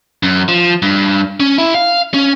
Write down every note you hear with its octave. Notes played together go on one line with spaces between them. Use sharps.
F#2
F3
G2
C#4
E4
F5
C#4